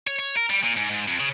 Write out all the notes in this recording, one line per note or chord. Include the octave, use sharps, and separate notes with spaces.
C#5
C#5
A#4
G3
A#2
G#2
G#2
F2
C#3